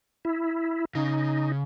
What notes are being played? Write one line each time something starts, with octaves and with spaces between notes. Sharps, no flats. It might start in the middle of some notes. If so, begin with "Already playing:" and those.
E4
C#3 D#4